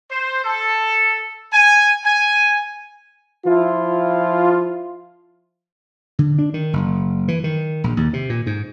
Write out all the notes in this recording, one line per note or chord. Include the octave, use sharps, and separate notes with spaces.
C5
A4
G#5
G#5
F3 E4 F4
D3
D4
D#3
F#1
E3
D#3
A#1
D#2
C3
A#2
G#2